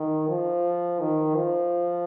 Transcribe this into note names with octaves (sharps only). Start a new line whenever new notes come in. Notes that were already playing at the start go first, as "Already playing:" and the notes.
Already playing: D#3
F3
D#3
F3